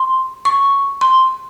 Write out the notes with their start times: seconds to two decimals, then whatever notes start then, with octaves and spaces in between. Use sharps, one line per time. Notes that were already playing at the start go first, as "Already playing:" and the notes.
Already playing: C6
0.45 C#6
1.01 C6